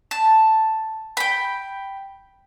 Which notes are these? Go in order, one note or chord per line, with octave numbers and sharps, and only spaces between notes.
A5
G5 B5